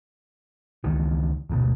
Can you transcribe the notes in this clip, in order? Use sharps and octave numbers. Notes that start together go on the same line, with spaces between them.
C#2 D#3 E3
D1 G#1 D2 B2